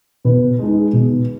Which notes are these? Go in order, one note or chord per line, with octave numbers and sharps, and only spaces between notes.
B2 B4
G#3 D#4
B2